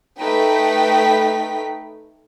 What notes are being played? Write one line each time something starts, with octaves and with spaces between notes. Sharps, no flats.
A3 D#4 B4 G5 B6